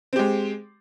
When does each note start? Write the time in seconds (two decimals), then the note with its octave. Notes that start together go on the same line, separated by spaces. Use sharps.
0.13 C4
0.16 G4
0.19 G#3